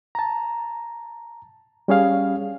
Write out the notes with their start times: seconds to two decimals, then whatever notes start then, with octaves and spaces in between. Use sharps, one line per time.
0.15 A5 A#5
1.88 G3 C#4 G#4 F5